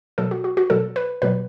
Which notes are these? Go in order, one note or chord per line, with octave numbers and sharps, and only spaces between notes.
B2 F#3 A4
F#4
F#4
F#4
B2 F#3 A4
B4
B2 F#3 B4